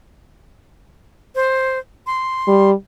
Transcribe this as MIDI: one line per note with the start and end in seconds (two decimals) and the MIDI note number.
1.35 1.79 72
2.07 2.70 84
2.48 2.73 55